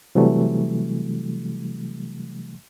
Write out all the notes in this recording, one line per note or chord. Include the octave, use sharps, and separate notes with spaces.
C3 E3 F#3 G3 A3